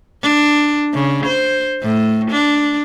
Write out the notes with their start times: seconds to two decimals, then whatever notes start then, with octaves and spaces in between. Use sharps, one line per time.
0.23 D4
0.94 C#3
1.27 C5
1.82 A2
2.32 D4